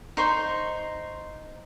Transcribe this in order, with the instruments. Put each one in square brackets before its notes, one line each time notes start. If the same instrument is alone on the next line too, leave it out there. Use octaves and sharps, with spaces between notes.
[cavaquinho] D#4 C5 C#6